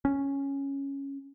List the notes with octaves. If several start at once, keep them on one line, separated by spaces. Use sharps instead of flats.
C#4